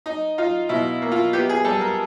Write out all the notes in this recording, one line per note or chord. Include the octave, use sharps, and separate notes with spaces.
D#4
D#4 F4
B2 E4
A#3
F4
B3 G4
G#4
G3 A4
A#4